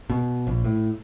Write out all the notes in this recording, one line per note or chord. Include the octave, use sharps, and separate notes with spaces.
B2
A#1
A2